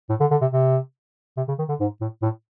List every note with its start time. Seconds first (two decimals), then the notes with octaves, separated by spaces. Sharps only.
0.09 A2
0.20 D3
0.31 D3
0.41 C3
0.52 C3
1.37 C3
1.48 C#3
1.59 D#3
1.69 D3
1.80 G#2
2.01 A2
2.22 A2